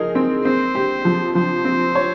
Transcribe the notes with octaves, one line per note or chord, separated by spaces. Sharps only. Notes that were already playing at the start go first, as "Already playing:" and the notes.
Already playing: F3 D#4 G#4 A#4
C4
C4 C5
G4
F3
F3 C5
C4
C#5